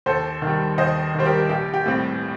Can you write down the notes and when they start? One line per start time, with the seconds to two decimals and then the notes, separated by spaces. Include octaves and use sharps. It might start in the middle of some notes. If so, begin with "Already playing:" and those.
0.06 D#2 A4 C5
0.42 D#3 G3
0.78 D#2 C5 D#5
1.15 D#3 G3 C5
1.26 G4 A#4
1.49 A#1 G4
1.74 G4
1.86 A2 G3 C4